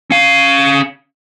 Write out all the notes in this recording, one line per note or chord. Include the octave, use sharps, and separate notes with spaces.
C#4 F5